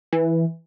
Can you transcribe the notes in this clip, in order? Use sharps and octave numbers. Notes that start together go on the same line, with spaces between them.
E3